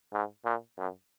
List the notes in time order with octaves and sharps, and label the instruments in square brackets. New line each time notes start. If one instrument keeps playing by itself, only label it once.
[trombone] G#2
A#2
F#2